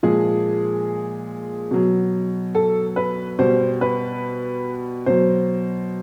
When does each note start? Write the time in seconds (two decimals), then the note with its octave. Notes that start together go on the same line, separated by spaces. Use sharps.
0.03 A#2 F3 G#3 G#4
1.71 B2 F#3
2.55 A4
2.96 B4
3.39 B2 G3 C5
3.81 B4
5.06 B2 F#3 C5